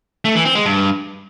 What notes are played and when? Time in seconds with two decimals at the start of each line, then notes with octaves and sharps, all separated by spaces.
0.25 A3
0.35 E3
0.45 C4
0.55 G#3
0.66 G2